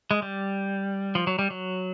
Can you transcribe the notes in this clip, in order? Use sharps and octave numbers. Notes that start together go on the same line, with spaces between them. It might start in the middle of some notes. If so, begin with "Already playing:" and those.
G#3
G3
F3
F#3
G3
F#3